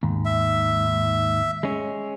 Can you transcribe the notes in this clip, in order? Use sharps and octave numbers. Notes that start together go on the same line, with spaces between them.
D#2 G#2
E5
G#3 C#4